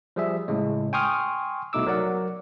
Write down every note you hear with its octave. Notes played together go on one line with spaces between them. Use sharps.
F3 G3 G#4 E5
A2 C#3 G#3
G5 G#5 C6 C#6 D#6 F6
C2 B2 A3 D#4 D6 E6
F#3 A#4 D5 F#5